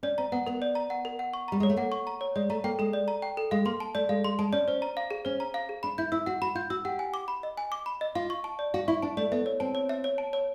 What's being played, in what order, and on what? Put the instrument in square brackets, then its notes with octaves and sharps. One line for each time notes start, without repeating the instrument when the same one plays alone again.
[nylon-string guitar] C#4 [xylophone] D5
[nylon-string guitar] C4 [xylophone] A#5
[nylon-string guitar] B3 [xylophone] F#5
[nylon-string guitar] B3 [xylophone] A#4
[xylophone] D5
A#5
F#5
A#4
F#5
C#6
[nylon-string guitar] G3 [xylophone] A#5
[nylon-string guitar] G#3 [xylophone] C#5
[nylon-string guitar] A3
[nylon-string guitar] A#3 [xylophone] F#5
[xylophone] C#6
A#5
C#5
[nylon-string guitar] G#3 [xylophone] D5
[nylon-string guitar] A3 [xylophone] A#5
[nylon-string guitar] A#3 [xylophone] G5
[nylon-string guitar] G#3 [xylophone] A4
[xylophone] D5
A#5
G5
A4
[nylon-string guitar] G#3 [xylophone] F5
[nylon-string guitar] A#3 [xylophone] C6
[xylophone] A5
[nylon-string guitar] A3 [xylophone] D5
[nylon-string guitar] G#3 [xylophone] F5
[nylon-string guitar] G#3 [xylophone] C6
[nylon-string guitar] G#3 [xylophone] A5
[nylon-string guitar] C#4 [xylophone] D5
[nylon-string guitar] C#4 [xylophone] C5
[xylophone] A#5
F5
G#4
[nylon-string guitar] C#4 [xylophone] C5
[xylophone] A#5
F5
G#4
[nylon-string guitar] D4 [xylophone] B5
[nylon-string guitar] E4 [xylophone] G6
[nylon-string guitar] E4 [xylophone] E6
[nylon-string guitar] F#4 [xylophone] F#5
[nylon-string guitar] F#4 [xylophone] B5
[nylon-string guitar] F4 [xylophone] G6
[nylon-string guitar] F#4 [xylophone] E6
[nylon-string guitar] G4 [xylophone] F#5
[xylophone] G#5
D6
B5
D#5
G#5
D6
B5
D#5
[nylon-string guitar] F4 [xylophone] F5
[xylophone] C#6
A5
D5
[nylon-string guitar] F#4 [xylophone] F5
[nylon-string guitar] E4 [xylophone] C#6
[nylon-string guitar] D4 [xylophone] A5
[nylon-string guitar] A3 [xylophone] D5
[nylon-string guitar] B3 [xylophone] E5
[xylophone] C#5
[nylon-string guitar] C4 [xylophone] A5
[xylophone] C#5
E5
C#5
A5
C#5